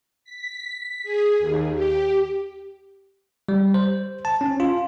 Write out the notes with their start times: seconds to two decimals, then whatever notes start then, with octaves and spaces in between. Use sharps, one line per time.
0.24 B6
1.03 G#4
1.39 D#2
1.75 G4
3.49 G3
3.74 C5
4.25 A5
4.41 C#4
4.60 F4